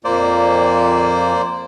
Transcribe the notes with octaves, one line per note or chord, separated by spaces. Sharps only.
F2 A#2 A#3 C5 D5